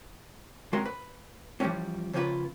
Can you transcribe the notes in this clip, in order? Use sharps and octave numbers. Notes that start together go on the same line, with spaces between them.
C3 G#3 C#4 F#4 A#4 C6
B4
E3 F3 G3 G#3 C4 C#4
C#3 F3 A#3 C#4 F4 B4